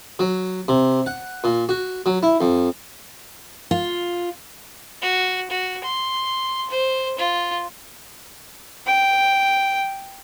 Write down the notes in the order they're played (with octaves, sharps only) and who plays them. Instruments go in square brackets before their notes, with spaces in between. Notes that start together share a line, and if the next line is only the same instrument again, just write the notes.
[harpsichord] F#3
C3
F#5
A#2
F#4
F#3
E4
F2
[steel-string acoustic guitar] F4
[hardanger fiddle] F#4
F#4
C6
C5
F4
[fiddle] G5